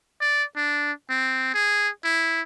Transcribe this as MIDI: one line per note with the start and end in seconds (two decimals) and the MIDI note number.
0.21 0.44 74
0.56 0.92 62
1.10 1.53 60
1.54 1.89 68
2.04 2.41 64